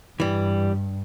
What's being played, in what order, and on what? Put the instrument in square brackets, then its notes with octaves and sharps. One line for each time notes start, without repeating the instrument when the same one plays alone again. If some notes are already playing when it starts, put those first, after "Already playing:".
[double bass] G2 [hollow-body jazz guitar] E3 G3